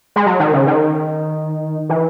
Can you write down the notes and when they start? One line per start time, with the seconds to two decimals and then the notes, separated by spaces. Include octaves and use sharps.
0.16 G#3
0.26 F#3
0.40 D#3
0.53 C#3
0.67 D#3
1.89 E3